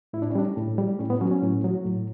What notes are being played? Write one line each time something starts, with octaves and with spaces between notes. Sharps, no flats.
A2 E4
D4
C#4
G3 D4
A2
G3
A2 C#4
B3
F#3 C#4
C#4
A2
F#3
A2